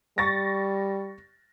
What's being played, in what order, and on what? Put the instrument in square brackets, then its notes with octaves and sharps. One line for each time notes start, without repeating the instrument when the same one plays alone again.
[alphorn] G3 [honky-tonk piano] C#6 A6 A#6